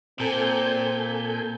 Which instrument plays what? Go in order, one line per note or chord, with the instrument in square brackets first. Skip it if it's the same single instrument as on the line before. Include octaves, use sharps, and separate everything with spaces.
[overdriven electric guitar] A#2 [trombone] C4 [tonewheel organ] A4 G#5 G6